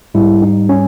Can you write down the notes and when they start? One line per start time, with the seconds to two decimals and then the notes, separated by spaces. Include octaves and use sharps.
0.14 G#2 G3 E4
0.42 D#4
0.69 C#4